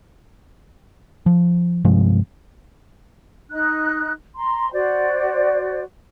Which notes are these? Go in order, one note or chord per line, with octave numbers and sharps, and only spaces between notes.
F3
G2 C3 F3 G#3
D#4 F#6
A#5 C6
F#4 C5 D5